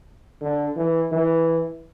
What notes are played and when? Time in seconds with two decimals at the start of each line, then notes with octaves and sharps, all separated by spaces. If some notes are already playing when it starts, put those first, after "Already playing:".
0.41 D3
0.76 E3
1.11 E3